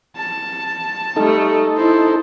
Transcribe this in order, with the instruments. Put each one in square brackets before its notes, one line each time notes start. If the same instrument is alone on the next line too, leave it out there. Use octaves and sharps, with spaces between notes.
[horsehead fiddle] A5
[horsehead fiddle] G3 A3 [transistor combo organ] D#4 A4
[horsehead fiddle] E4 C5